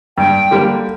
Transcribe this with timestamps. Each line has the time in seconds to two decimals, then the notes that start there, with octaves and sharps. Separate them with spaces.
0.18 G2 G5
0.51 D3 G3 A#3